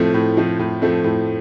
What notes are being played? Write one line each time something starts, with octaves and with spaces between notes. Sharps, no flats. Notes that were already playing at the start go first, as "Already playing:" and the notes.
Already playing: A2 F3 A3 C4
A2
F3 A3 C4
A2
F3 A3 C4
A2